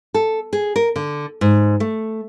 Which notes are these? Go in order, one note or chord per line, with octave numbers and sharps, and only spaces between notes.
A4
G#4
A#4
D3
G#2
A3